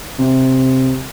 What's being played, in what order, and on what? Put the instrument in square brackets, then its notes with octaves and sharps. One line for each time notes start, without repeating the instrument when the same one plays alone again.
[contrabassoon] C3